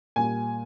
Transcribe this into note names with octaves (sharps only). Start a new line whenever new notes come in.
A#2 G3 G#5